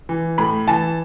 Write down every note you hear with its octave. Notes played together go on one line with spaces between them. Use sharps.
E3
A2 B5
E3 A5